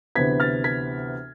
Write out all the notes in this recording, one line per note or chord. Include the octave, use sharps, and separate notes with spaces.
D2 C3 E3 B3 G#6 B6
F6 A6
G#6 B6